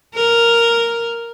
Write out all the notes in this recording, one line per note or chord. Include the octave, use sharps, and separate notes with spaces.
A#4